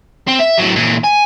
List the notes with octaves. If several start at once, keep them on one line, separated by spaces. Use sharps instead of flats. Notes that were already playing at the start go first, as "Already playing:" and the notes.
C4
E5
A2 F#3
A#2 E3
G#5